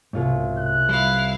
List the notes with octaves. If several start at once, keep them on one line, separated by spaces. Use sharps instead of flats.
C2 G#2 B2 F4 C#5
F#6
G3 E4 F5